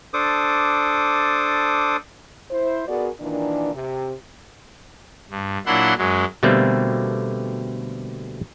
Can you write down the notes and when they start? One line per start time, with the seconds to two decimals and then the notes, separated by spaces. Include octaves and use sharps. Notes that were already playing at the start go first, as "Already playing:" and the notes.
0.14 D4 A4 C5 D6 D#6
2.51 E4 C5
2.88 B3 F#4 G#4 A#4 D5
3.21 A#2 D#3 E3 D4
3.75 C3
5.31 G2
5.66 A#2 F#3 D4 E4 F#5 C6
5.98 F#2 F#3 G#3
6.43 B2 D3 G3 A3 A#3 C4